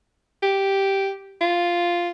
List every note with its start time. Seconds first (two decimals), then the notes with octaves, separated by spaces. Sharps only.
0.43 G4
1.41 F4